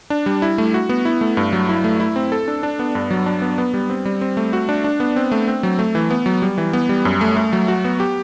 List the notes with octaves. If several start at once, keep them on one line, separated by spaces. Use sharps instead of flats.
D4
G3
E4
A3
F#4
B3
E4
A3
G2
F#3
E4
A3
E4
C4
A4
D4
D4
B3
G2
F#3
D4
B3
B3
G3
C4
G3
C4
A3
F#4
D4
D4
B3
C4
A3
C4
F#3
A3
E3
B3
F#3
G3
E3
B3
G3
F#2
A3
A3
F#3
F#4
B3
G4